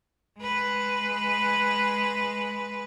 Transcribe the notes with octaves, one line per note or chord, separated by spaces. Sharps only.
G#3 B4